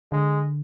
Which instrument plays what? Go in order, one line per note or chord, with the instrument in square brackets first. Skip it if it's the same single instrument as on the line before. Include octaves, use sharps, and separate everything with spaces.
[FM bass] D3 [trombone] G#3